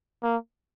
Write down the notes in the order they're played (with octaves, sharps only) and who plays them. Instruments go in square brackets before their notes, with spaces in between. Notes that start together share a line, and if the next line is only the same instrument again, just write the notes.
[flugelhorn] A#3